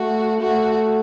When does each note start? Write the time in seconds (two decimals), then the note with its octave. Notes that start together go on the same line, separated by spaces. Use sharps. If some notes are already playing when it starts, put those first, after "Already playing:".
Already playing: A3 F#4
0.41 A3 F#4